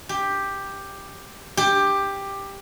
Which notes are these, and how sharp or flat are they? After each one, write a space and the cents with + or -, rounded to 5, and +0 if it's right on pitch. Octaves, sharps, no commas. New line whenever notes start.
G4 +5
G4 +10